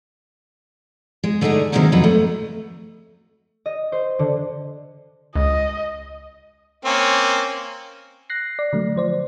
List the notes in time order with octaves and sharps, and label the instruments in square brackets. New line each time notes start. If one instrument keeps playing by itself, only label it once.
[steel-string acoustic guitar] G#3
D3 A3 D4 D#4 G#4
C3 D#3 F#3 G#3 A#3 C#4
F2 D#3 F#3 B4 A#5
A3
[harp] D#5
C5
D3
[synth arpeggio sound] C#2 [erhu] D#5
[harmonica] A#3 C4 C#4
[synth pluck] F#6 A#6 C7
D5
D3 F#3 A3
F3 C5 D5